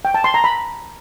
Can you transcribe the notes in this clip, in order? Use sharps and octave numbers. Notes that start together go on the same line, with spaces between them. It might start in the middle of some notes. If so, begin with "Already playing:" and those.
G5
A5
C6
A#5
B5